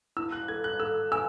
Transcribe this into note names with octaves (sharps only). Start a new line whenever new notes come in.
E4 E6
F#6
A4 G#6
F#6
A4 E6
G#5 E6